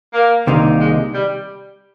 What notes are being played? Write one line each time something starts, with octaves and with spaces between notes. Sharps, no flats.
A#3
C2 C3 D#3 A#3 D#4
G#3
G3